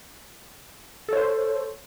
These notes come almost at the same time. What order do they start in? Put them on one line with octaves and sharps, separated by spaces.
A4 C#5 C5